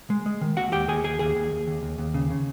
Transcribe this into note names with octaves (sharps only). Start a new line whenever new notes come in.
G#3
G#3
D#3
D#2 F#4 F#5
D#2 G4 G5
D#2 G#4 G#5
D#2 G#4 G#5
D#2 G#4 G#5
D#2
D#2
D#2
D#2
D#2
C#3
C#3